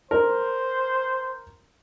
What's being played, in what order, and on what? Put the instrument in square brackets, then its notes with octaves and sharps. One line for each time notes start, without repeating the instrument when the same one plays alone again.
[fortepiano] A#4 [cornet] C5